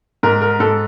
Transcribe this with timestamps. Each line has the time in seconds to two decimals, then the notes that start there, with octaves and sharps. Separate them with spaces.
0.23 G#2 A#4
0.42 A#4
0.60 G#2 A4